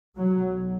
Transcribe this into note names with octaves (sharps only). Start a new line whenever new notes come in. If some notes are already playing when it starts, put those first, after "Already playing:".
B1 F#3